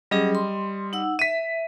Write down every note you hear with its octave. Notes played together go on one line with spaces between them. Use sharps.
F#3 G3 C#4 G#4 D#5
C6
D#4 F#5 E6
E5 B6 D#7